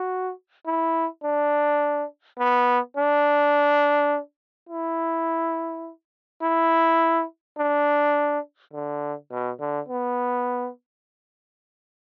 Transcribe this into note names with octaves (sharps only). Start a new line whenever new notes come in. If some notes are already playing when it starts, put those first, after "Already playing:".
Already playing: F#4
E4
D4
B3
D4
E4
E4
D4
D3
B2
D3
B3